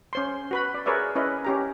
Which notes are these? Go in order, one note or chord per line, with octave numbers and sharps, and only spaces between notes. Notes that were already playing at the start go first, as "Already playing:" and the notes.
C#4 C5 C6
F#4 B4 B5
D5
G#4 A#4 B4 C#5 D5 E5
C#4 E4 B4 D#5
C#4 G4 A#5